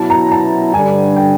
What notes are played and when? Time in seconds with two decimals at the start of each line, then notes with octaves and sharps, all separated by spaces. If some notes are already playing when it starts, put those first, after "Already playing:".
Already playing: B2 F#3 B3 E4 A5
0.10 A#5
0.32 A5
0.74 G2 D3 G3 G#5
1.16 G5